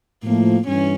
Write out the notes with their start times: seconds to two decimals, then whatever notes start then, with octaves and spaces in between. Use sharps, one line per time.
0.24 A2 F3 A3 A#3
0.67 G2 E3 C#4